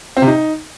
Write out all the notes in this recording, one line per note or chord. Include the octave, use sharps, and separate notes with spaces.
C4
C3
D#4